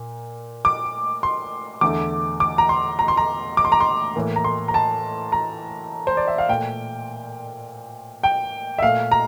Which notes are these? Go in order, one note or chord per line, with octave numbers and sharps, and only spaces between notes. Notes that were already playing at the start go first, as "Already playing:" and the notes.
Already playing: A#2 A#3
D6
C6
E2 D3 A3 D6
D6
A#5
C6
A#5
C6
A#5
D6
C6
A#5
C6
A2 E3 A#3
A#5
C6
A#5
A5
A#5
C5
D5
E5
F5
A#2 A3 G5
G5
E5
A#2 A3 F5
A#5